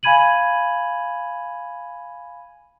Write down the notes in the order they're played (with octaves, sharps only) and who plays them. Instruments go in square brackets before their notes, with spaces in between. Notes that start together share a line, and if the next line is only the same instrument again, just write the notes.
[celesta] F5 G#5 B5 G#6 D#7 F#7